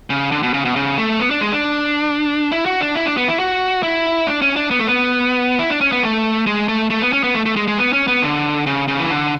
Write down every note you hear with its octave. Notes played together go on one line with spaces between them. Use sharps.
C#3
D3
B2
C#3
B2
C#3
A3
B3
D4
G#3
D4
E4
F#4
D4
E4
D4
B3
E4
F#4
E4
D4
C#4
D4
B3
A3
B3
E4
D4
C#4
B3
A3
G#3
A3
A3
B3
C#4
B3
A3
A3
G#3
G#3
B3
C#4
B3
D3
C#3
C#3
E3
D3